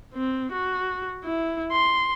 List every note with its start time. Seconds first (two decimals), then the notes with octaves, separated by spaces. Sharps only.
0.14 C4
0.52 F#4
1.24 E4
1.72 C6